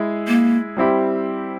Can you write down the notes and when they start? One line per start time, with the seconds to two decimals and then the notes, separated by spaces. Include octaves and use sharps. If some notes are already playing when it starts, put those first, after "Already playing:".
Already playing: G#3 E4 G#4
0.28 A#3
0.77 G3 C4 E4 G4